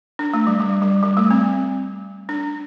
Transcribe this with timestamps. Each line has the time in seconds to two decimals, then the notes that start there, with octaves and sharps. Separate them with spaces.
0.19 D4
0.34 A3
0.47 G3
0.61 G3
0.82 G3
1.03 G3
1.17 A3
1.31 C4
2.29 D4